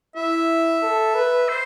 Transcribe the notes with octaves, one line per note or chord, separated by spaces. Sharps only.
E4 E5
A4
B4
C5